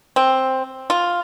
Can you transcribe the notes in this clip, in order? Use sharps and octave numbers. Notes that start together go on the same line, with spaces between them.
C4
F4